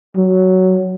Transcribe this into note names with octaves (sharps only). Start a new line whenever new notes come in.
F#3